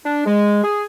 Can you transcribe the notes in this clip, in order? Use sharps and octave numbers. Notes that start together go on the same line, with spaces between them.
D4
G#3
G#4